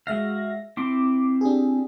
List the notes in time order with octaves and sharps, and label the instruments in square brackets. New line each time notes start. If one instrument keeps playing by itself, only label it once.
[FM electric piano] G#3 E5 A#6 [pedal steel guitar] F#4 F5
[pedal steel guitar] C4 E4 C6 [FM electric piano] D6
[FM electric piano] D4 G4 G#4